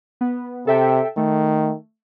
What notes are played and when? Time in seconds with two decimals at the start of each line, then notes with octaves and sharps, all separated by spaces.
0.21 B3
0.67 C3 A4 E5 G5
1.17 D#3 A3